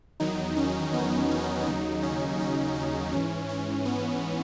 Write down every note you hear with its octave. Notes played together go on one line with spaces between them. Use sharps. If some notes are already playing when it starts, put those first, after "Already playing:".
E2 D#3 F#3 D#4
C#4
B3
C#4
D#2 C#3 F#3 D#4
C#4
D#4
C#4
G#2 E3 C#4
C#4
B3